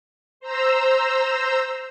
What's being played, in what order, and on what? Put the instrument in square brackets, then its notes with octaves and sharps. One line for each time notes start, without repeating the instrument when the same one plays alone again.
[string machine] C5 A#5 E6